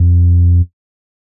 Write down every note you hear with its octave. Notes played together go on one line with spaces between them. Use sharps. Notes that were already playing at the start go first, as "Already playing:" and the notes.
Already playing: F2